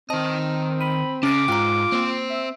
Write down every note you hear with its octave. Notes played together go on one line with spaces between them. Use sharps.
D#3 C4 D#5 A5
B5 D#7
C#3 C#4 D6 A6 A#6
G#2 F4 G5 A#5
A#3 C4 C5
E5